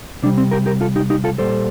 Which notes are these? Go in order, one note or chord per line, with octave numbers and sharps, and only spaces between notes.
C3 G3 D4
C4
G4 A#4
G4 A#4
F4 A4
D#4 G4
D#4 G4
F4 A4
A#2 G3 A4 C5